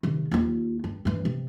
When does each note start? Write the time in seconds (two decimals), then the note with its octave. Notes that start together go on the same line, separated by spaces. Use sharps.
0.03 C3 D#3
0.31 D#2 F4
0.84 G2
1.05 G2 E3
1.25 C3